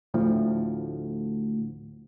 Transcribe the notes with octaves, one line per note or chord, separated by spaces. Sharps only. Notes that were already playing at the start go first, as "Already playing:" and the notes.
D2 A2 F3